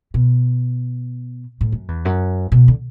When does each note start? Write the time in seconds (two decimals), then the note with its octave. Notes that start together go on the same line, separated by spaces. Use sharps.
0.14 B2
1.61 A2
1.72 F#2
1.88 E2
2.05 F#2
2.52 B2
2.68 D3